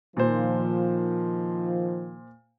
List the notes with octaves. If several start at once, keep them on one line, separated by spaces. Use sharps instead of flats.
A#2 D#3 F3 C5